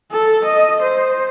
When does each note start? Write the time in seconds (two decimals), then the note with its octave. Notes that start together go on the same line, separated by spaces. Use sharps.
0.12 A4
0.44 D#5
0.81 C5